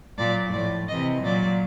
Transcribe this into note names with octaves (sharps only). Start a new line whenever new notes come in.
A#2 F#3 D5
A2 F3 D5
C3 E3 D#5
A#2 F#3 D5